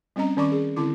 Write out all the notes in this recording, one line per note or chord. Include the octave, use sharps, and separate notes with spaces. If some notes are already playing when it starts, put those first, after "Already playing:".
G3 C4 C#4 D#5 A#5
D#3 C#4 D5 B5 C#6 D6
G#4
D3 C4 E4 D6